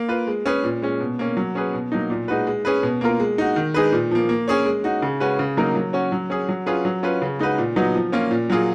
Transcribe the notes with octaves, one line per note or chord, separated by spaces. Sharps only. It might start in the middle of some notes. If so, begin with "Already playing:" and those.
Already playing: A#3
F4 B4
G#3
C#4 G#4 B4
A#2
G#3 C#4
B2
A#3 C#4
F#3
C#4 G#4 B4
B2
F#3 A#3 D#4
A#2
G#3 D#4 F#4 B4
G#3
C#4 G#4 B4
B2
A#3 F4 A#4
G#3
D#4 F#4
D#3
G#3 D#4 G#4 B4
A#2
F3 A#3
A#3
C#4 G#4 C#5
G#3
D#4 F#4
C#3
G#3 C#4 F#4 B4
C#3
F#3 A#3 D#4 A#4
F#3
C#4 F#4 C#5
F#3
C#4 G#4
F#3
C#4 F4 G#4 B4
F#3
C#4 F4 B4
C#3
G#3 D#4 F#4 B4
A#2
F#3 B3 D#4 F#4
F3
A#3 C#4 F4
A#2
F#3 A#3 F4 G#4